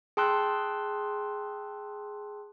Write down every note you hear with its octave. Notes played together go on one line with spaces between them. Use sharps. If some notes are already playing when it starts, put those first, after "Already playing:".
G#4 G5 A5 C6 E6 F#6